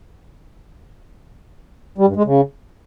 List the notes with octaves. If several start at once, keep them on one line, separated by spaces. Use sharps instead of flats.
G3
G2
G#3
C#3